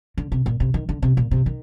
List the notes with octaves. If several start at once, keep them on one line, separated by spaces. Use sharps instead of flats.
D3
C3
A#2
C3
D#3
D3
C3
A#2
C3
D#3